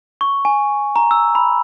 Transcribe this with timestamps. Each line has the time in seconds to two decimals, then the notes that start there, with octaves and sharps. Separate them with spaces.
0.21 C#6
0.45 G#5
0.96 A#5
1.11 E6
1.35 B5